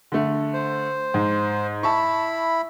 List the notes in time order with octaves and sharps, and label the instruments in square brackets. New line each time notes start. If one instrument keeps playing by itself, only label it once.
[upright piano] D3 A3
[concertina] C5
[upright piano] G#2
[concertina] E4 B5 [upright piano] A5 C#6